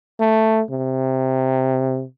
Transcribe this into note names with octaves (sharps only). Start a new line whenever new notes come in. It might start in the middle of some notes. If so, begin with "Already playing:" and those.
A3
C3